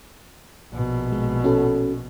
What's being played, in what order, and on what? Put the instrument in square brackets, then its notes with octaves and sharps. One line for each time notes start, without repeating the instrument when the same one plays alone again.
[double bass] A#1 B2
[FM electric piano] G#3
C#4 F#4 A4